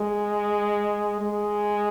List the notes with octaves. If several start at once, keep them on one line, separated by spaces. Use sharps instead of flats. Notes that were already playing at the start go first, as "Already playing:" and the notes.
Already playing: G#3
G#3